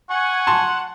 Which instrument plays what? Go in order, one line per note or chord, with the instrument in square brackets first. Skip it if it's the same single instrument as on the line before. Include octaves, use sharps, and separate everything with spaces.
[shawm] F#5 [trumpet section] G#5 C#6
[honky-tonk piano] A5 C6